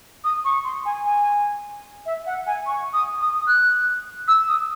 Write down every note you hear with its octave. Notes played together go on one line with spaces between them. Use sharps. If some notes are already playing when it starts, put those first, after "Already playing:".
D#6
C#6
C6
G#5
G#5
E5
F#5
G#5
C#6
D#6
D#6
F#6
E6
D#6